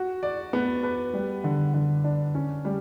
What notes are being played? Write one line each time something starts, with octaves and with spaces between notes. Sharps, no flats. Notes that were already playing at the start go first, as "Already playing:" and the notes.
Already playing: F#4
D5
B3
B4
G3
D3
D3
D4
C#4
G3